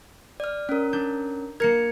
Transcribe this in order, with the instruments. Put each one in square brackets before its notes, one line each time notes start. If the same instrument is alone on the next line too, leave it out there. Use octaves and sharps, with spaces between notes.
[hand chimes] D5 F6
C#4 A#4
[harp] D4 G6
[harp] A#3 A#4 [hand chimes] G#6 C#7